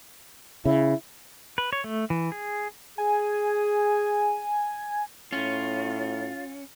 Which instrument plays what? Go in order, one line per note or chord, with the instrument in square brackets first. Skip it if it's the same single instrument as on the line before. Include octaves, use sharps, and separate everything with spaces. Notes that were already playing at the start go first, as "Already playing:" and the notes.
[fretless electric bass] C#3 [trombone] E4
[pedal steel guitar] B4
C#5
A3
E3
G#4
[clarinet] G#4 [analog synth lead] G#5
[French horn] A2 [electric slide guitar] C#4 [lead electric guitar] F4